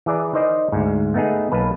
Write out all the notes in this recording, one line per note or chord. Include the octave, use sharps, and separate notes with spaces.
E3 G#4 D5 A#5
D#4 A#4 C5 D5 D#5
D2 G#2
A3 B3 D#4 G#4
B1 A#3 B4 A5